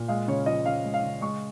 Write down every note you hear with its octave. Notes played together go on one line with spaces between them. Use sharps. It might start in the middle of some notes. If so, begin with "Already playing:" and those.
Already playing: A#2
G#3 F5
C#3 C#5
F3 D#5
C#3 F5
G#3
F5
C#3
G#3 C#6